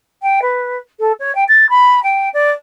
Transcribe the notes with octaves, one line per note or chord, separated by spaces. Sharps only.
G5
B4
A4
C#5
G5
A6
B5
G5
D5